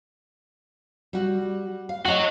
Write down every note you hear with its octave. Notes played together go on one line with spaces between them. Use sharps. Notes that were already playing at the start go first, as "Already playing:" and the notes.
G3 F#4
F5
F#4 C#5 D#5 F5 F#5